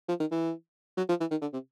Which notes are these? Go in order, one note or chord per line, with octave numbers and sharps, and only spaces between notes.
F3
D#3
E3
F#3
F3
E3
D#3
D3
C3